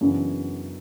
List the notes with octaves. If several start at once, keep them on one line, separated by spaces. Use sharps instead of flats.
F#2 C#3 E3 B3 D4